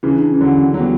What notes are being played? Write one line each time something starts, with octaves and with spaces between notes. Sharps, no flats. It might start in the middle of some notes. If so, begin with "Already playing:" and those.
C#3 E3 C#4
D4
C#4
E3
D3 F#3
F#3
E3 G3 B3